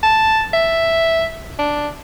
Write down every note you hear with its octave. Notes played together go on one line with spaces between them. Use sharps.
A5
E5
D4